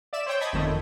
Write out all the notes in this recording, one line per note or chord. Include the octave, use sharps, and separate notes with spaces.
D5 E5 E7
C5 C#5 G5
D#5 A5 B5 D#6 G#6
G1 F2 D#3 A3